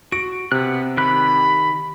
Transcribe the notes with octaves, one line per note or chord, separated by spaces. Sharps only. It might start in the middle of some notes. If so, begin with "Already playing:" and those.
F#4 D7
C3 B3 F#6
D#3 G4 B5 F#6